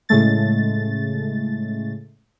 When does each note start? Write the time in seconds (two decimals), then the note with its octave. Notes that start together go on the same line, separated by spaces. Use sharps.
0.09 A2 C#3 G#3 A3 A6